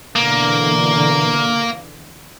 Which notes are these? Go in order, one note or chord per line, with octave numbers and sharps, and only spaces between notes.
B2 D3 E3 A#3